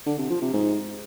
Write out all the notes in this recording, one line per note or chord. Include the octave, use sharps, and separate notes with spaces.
D3
C3
F3
C3
G#2